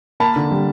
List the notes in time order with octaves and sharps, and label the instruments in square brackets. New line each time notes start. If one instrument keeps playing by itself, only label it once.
[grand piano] A#3 A5 B5
D3
G3